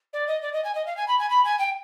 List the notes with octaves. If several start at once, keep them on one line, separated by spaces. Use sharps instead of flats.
D5
D#5
D5
D#5
G#5
D#5
F5
G#5
B5
G#5
B5
G#5
G5